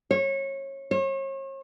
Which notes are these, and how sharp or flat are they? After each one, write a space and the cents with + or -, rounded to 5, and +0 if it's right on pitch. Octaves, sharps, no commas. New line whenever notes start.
C#5 -25
C#5 -40